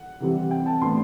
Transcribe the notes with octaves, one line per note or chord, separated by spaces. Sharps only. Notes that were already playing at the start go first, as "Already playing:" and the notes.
Already playing: F#5
C3 E3 G3 C4
G5
A5
A2 E3 B3 D4 C6